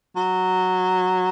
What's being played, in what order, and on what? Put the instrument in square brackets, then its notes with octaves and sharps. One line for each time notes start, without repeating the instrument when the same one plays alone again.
[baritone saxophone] F#3